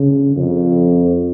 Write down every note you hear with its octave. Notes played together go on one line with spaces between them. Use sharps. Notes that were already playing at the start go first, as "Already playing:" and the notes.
Already playing: C#3
F2